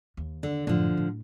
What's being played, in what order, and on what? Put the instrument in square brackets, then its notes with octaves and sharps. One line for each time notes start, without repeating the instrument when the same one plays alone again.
[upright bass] D#2
[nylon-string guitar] D3
[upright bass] F#2 A2 [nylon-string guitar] D3 F3
[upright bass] A2